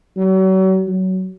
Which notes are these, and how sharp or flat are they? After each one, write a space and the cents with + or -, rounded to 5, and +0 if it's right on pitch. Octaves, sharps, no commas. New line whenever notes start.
F#3 +40
F#3 +20